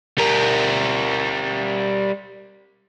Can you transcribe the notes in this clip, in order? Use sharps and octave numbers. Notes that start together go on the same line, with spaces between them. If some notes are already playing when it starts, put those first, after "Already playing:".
G3 A#4